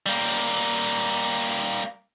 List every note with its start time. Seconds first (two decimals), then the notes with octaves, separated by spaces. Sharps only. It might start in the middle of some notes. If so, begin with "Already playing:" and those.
0.06 G3 A#3